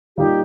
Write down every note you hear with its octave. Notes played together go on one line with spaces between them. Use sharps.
A#2 G3 A#3 D#4 G4